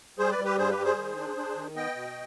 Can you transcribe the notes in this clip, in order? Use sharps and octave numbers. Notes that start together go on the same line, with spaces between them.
G3 G#4 C5
B4 D5
G3
G4 B4
G2 G#4 C5
G4 B4
G3
G#4 C5
D#3
D4
D4
D#3
B3 D#5 G5
B2